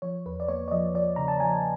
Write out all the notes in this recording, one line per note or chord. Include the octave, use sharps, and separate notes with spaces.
F3 C#5
E2 B4
D5
A#3 C#5
D5
F3 D#5
F3 D5
C#3 A#5
A5
F3 G#5